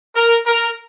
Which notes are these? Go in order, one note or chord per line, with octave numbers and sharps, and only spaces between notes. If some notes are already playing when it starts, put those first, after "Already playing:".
A#4
A#4